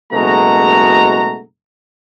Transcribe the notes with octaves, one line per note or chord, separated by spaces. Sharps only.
F#1 B2 G#3 A3 F#4 A#5